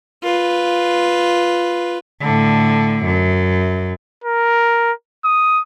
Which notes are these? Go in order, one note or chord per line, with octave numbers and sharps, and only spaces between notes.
F4 B4
A2 D3
F#2
A#4
D#6